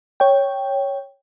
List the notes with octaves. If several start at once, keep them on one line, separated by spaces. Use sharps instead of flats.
C#5 G5